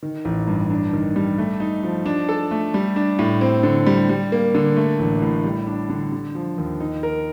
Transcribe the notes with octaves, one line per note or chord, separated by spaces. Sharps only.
D#3
A1
G2
D4
D#3
G3
A3
D#4
F3
D4
A4
A3
G3
D4
A2
C4
D3
G3
G3
A#3
D3
A3
A1
A2
G3
D4
D3
D3
F3
D#2
D#4
A#4